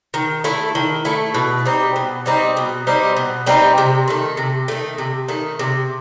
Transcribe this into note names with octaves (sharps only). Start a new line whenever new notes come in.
D#3
A3 E4 A4
D#3
A3 E4 A4
B2
G3 C4 D#4
B2
G3 C4 D#4
B2
G3 C4 D#4
B2
G3 C4 D#4
C3
D#3 A3
C3
D#3 A3
C3
D#3 A3
C3